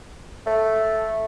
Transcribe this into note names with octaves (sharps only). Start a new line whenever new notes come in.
A3